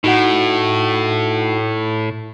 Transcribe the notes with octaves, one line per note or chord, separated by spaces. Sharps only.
A2 D#4 F#4 F#5